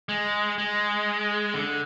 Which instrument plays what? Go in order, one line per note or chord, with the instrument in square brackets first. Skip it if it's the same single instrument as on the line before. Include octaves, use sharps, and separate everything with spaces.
[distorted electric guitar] G#3
G#3
D3